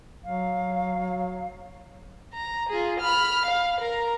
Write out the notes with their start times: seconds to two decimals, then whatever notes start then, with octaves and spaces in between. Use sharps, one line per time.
0.24 F#3 F5
2.34 A#5
2.69 F4 G#4
3.00 B5 F6
3.45 F5
3.80 A#4 A#5